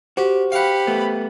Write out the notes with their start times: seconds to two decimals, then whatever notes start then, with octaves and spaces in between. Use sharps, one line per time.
0.17 F#4 G4 C5
0.52 G4 F5 F#5 B5
0.87 A3 B3